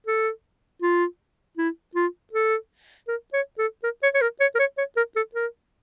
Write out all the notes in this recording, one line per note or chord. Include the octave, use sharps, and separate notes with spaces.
A4
F4
E4
F4
A4
A#4
C#5
A4
A#4
C#5
C#5
A#4
C#5
A#4
C#5
C#5
A#4
A4
A#4